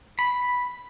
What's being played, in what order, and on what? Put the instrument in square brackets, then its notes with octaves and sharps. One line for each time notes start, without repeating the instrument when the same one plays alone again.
[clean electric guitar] B5